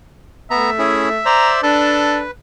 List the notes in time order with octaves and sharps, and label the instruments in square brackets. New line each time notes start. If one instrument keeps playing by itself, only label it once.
[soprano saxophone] A3 [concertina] B3 A#5 [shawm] E5
[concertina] C#4 E4 G#4
[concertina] C5 D5 [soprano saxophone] A#5
[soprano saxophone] D4 [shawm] A4 [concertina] B4